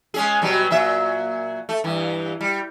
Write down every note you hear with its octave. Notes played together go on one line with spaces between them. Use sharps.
G#3 C#4 G#4
B2 F#3 G3
A#2 F#3 E5
A3
G2 E3
G3